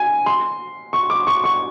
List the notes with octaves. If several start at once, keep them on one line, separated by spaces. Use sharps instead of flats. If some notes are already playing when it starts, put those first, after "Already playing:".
Already playing: G#5
C6
C#6
D6
C#6
C#6